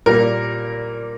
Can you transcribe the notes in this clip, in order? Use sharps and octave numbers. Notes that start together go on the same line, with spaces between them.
A#2 G3 A#3 A#4